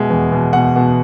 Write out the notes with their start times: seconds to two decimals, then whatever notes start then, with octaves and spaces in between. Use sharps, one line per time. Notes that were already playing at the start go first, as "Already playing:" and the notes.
Already playing: B2 G#3 E5
0.10 E2
0.32 B2
0.53 B2 F#5
0.76 B2